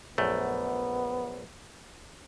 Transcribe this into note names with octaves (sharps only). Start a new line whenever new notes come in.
A#1 F#2 A3 B3